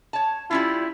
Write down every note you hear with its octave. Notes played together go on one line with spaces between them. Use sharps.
C#5 A5
G3 C#4 E4 F4